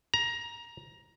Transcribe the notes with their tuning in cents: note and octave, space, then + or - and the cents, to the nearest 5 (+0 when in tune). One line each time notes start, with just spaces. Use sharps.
A#5 +15